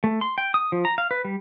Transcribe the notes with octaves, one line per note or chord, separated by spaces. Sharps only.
A3
C6
G5
D#6
F3
A#5
F5
B4
G3